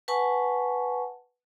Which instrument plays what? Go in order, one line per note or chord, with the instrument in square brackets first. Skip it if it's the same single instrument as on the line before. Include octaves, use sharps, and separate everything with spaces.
[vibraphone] B4 F#5 G#5 A5 C#6